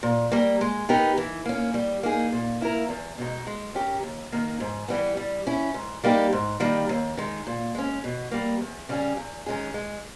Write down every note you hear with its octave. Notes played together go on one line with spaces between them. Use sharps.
A#2
G3 A#3
G#3
B3 D#4 G4 A#4
E3
A#3 C#4
G3
A#3 D#4 G#4
A#2
A#3 E4 A#4
E2
B2 G#3 D#4
G#3
C#4 G4 A#4
D#2
D#3 A#3
G#2
E3 G3 B3
G3
C#4 E4
G#2
G3 A#3 D#4 G4
G#2
D#3 G3 A#3
D#2
D#3 G#3
A#2
G#3 C#4
B2
G3 A#3
E2
C#3 G3 C#4 G#4
E2
D#3 G#3 C#4 G#4
G#3